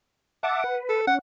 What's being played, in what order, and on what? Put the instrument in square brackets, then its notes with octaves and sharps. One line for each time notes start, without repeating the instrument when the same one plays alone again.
[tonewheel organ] E5 A5 D6 [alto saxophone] F#5
[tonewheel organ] B4
[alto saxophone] A4
[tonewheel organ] C#4 [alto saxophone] F#5